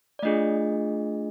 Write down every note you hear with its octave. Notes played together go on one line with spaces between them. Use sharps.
D5
A3 D4 F4 G#4 D#5